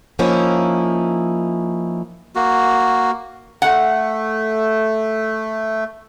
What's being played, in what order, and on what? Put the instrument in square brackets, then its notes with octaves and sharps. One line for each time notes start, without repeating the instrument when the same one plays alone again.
[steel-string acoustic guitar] F3 A#3 C#4 D#4 E4
[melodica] A#3 F#4
[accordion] A3 [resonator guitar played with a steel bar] F#5